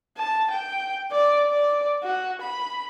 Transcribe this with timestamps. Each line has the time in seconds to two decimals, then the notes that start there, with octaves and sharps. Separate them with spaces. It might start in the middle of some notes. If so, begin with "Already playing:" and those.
0.17 A5
0.51 G5
1.11 D5
1.48 D5
2.03 F#4
2.41 B5